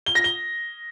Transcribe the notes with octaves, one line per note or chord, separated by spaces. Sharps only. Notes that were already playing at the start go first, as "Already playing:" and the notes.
G7
A#6
G7